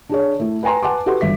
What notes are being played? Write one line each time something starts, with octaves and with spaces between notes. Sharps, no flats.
D4 G#4 C#5
A3 E4
B4 G5 G#5 A#5 C6
B4 F#5 G#5 A5 C6 D6
F#4 G4 A4 B4 F#5 C6
G1 E5 B6